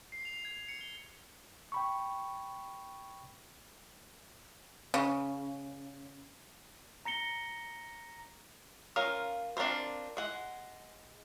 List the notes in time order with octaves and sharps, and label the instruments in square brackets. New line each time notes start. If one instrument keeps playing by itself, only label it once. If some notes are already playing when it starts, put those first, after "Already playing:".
[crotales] C7
F7
G#6
C#7
G7
[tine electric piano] G5 B5 C#6
[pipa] C#3
[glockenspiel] A#5 A#6 C#7 G7
[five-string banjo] C#4 F4 A#4 F5
C4 D4 F4 A#4 C5
G#3 F#5